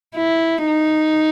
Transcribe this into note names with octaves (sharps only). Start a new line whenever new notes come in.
E4
D#4